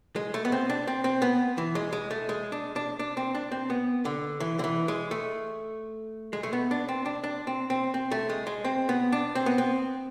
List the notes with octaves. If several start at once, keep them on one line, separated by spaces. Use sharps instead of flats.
G#3
A3
B3
C4
D4
C4
C4
B3
E3
G#3
G#3
A3
G#3
D4
D4
D4
C4
D4
C4
B3
D3
E3
D3
E3
G#3
A3
G#3
A3
B3
D4
C4
D4
D4
C4
C4
C4
A3
G#3
G#3
C4
B3
D4
C4
B3
C4